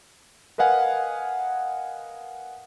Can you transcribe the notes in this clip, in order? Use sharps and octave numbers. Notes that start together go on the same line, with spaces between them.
A#4 B4 D#5 F5 F#5 G#5